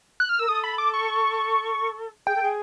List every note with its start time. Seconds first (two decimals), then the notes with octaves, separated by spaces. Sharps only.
0.20 F#6
0.29 F6
0.39 A#4 E6
0.48 A4 D#6
0.64 B5
0.78 D6
0.94 C#6
2.27 G#4 G5
2.35 A4
2.42 G#4